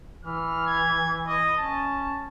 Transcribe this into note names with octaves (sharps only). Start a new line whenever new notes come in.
E3 F6
G#6
D#5
C#4 A5